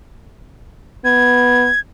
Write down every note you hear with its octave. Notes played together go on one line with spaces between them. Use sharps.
B3 G#6